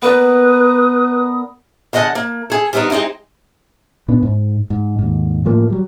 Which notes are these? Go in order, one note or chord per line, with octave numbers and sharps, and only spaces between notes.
B3 A#4 B4 D5 D#6
E2 D3 D#5 F#5 A5
A#3
G#4 A4
G3 B3 C4 D4 D#4
G#3 C4 D#4 E4 G4
A#2 B3 D4
G#2
G#2
D#2 G#2
A2 F3 A#3
F#3 G3